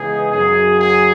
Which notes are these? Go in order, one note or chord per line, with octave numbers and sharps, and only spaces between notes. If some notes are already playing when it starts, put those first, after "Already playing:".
Already playing: C#3 E3 G#3 B3 D#4 G#4
F#2 C#3 F#3 G#4
G#4